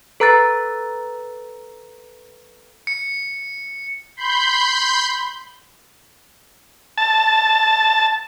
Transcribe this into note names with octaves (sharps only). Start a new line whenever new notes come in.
A4 B4 A#5 E6 F#6 A6
C#7
B5 C6 G6
A5